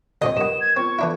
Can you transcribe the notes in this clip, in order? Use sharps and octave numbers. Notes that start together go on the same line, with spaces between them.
D2 A#2 C4 D#5
G2 B3 A#4 D#6 E7
G#6
B3 C4 F4 C#6
E3 D4 E4 F4 A4